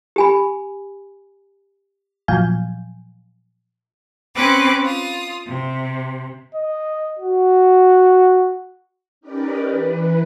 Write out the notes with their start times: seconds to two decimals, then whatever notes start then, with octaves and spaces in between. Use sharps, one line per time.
0.16 G4 G#5 B5
2.28 A#2 F3 F#3 F5 G#5 G6
4.34 C4 C#4 B4 D6 F#6
4.84 F4 D#6
5.46 C3
6.55 D#5
7.19 F#4
9.21 C#4 D#4 G4 A#4 B4 D5
9.68 E3 B4